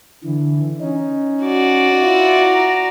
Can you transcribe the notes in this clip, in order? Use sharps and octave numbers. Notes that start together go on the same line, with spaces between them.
D3 E3
C#4 D#4
F#4 D5
E4 F4
A#5